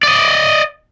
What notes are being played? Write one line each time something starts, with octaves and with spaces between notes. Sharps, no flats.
D5 D#5